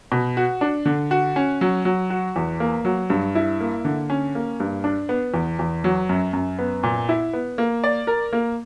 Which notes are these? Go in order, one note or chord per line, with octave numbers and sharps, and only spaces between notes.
B2
F#4
D4
D3
F#4
C#4
F#3
F#3
F#4
E2
A#3
F#3
G2
E4
A#3
D3
C#4
A#3
G2
D4
B3
E2
E2
F#3
F#2
F#2
B3
A#2
E4
B3
A#3
D5
A#4
A#3